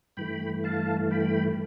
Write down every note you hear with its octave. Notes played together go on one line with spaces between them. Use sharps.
G2 E3 A3 G5 B5
F5 A5
G5 B5